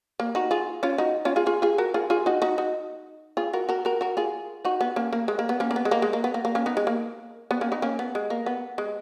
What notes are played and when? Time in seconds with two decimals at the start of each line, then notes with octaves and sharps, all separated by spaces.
0.20 A#3
0.35 D#4 F#4
0.51 F4 G#4
0.83 C#4 F4
0.98 D#4 F#4
1.25 C#4 F4
1.36 F4 G#4
1.46 F4 G#4
1.62 F4 G#4
1.78 F#4 A#4
1.94 F4 G#4
2.10 F4 G#4
2.26 D#4 F#4
2.42 D#4 F#4
2.58 D#4 F#4
3.37 F4 G#4
3.53 F#4 A#4
3.69 F#4 A#4
3.85 F#4 A#4
4.01 F#4 A#4
4.17 F4 G#4
4.65 D#4 F#4
4.81 B3
4.96 A#3 C#4
5.13 A#3
5.28 G#3
5.39 A#3
5.49 B3
5.60 A#3 C#4
5.71 A#3
5.76 B3
5.85 G#3
5.91 A#3
6.02 G#3
6.13 A#3
6.24 B3
6.34 A#3
6.45 A#3
6.55 A#3 C#4
6.66 B3 D#4
6.77 G#3
6.87 A#3
7.51 B3
7.61 A#3 C#4
7.72 B3 D#4
7.82 A#3 C#4
7.99 B3
8.15 G#3
8.30 A#3
8.46 B3
8.78 G#3